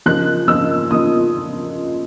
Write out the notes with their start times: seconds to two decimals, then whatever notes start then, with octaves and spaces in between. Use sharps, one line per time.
0.06 C#3 F3 A#3 D#4 F#6
0.48 C#3 F3 A#3 D#4 E6
0.91 C#3 F3 A#3 D#4 D#6